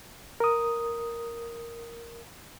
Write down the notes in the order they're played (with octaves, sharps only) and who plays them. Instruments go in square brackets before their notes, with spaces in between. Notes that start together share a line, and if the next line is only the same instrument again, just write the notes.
[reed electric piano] A#4 D#6